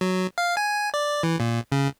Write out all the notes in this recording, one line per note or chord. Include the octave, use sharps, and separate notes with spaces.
F#3
F5
G#5
D5
E3
A#2
C#3